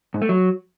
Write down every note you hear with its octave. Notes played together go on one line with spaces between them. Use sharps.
G#2
A3
F#3